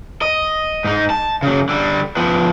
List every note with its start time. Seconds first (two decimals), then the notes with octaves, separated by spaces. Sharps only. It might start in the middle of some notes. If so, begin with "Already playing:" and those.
0.22 D#5
0.84 G#2 D#4
1.10 A5
1.43 C#3 F#3
1.69 D3 G3
2.17 F3 B3